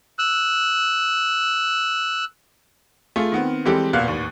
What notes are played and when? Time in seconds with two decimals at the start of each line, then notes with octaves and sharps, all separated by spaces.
0.19 E6 F#6
3.16 A3 F4 G#4 F6
3.32 D#3 B3 C4
3.65 E3 G3 G#3 C4 G4 A4
3.93 E1 A#2 B3 F5 F#6
4.08 A1 D#2